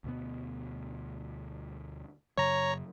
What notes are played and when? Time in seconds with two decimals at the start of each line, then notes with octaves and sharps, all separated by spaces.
0.04 D2 B2 B3
2.38 F#2 C#3 F#3 C#5 A#5